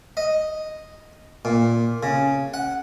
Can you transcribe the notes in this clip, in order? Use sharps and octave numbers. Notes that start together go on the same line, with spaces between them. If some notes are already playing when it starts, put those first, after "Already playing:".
D#5
A#2
C#3
F#5